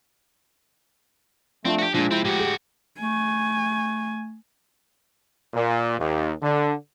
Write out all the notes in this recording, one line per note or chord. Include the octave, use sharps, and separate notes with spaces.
F3 A3 C4 D4 F4
F#4 G4
A#2 F3 G#3 D4
C4 E4 G4
A2 F#4 G4
G#4
A3 G#5
A#2
D#2
D3